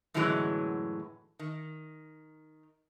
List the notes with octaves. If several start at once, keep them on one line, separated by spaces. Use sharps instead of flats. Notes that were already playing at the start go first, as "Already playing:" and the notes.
F#2 A2 D3 E3 F#3 G#3
D#3